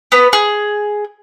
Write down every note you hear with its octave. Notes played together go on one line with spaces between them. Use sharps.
B3 B4
G#4